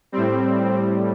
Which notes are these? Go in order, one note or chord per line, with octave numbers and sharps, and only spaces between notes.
A2 G3 C4